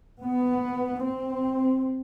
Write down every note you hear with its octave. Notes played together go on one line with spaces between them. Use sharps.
B3
C4